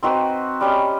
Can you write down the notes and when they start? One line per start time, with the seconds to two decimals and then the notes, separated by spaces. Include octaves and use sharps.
0.03 C4 D#4 F#4 B4
0.61 G3 C#4 D#5